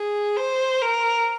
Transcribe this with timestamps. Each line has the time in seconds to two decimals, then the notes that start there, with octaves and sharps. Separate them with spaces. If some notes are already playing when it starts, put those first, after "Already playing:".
Already playing: G#4
0.37 C5
0.81 A#4